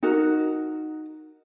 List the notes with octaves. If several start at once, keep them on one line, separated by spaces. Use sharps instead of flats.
D#4 F#4 A#4